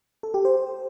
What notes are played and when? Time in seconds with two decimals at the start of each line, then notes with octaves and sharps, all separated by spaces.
0.23 A4
0.34 G4
0.45 C5